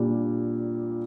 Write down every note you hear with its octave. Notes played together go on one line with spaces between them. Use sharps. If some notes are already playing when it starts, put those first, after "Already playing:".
Already playing: A#2 G3 A#3 D4